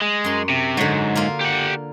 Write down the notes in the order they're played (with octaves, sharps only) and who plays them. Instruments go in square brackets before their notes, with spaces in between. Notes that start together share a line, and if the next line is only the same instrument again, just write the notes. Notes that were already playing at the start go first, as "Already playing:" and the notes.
[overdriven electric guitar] G#3
[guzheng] F#2 C6
[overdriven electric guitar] C3
[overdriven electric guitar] G#2 [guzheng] D3 F#3
[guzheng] A#3 F4
[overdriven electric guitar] G4 F#5